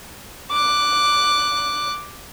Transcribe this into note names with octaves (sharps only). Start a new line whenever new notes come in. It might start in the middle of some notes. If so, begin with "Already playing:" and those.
D6 F#6